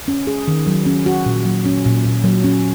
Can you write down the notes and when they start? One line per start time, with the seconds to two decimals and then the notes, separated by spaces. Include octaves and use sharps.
0.08 C#4
0.27 G#4
0.48 D#3
0.67 F#3
0.86 C#4
1.06 F#4
1.26 A#2
1.45 F#3
1.65 C#4
1.86 A#2
2.05 A#2
2.24 F#3
2.44 C#4